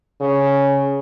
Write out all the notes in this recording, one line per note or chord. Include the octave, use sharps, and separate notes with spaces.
C#3